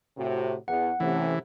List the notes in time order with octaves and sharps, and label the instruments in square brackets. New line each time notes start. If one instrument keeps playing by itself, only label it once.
[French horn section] A2 C3 F#4
[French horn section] E2 [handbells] F#5
[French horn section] C3 A3 C#4 [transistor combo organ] E3